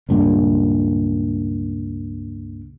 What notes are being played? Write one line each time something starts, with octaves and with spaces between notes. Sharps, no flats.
C#2 G2 A#2